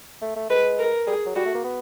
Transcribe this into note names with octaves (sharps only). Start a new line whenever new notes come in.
A3
A3
G#3 B4
A#4
G3 G#4
F#3
G3 F#4
A3
A#3
B3